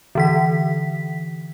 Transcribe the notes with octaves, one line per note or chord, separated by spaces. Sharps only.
D3 E3 B6